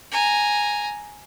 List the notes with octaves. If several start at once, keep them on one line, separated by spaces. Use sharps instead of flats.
G#5 A#5